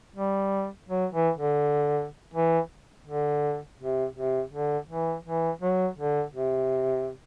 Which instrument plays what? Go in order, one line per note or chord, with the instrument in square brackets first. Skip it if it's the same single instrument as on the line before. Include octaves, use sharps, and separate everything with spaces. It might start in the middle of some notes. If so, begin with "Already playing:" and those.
[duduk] G3
F#3
E3
D3
E3
D3
C3
C3
D3
E3
E3
F#3
D3
C3